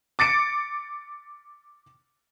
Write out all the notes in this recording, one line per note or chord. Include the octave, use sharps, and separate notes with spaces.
D6 A6 C#7 D7